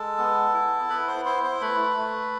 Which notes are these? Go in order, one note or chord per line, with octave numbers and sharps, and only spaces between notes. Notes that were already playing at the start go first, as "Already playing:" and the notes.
Already playing: G#3 A4 A5
B3
E4
B3 B4 B5
C5 C6
E4 C5 C6
C5 C6
A3 B4 B5
A3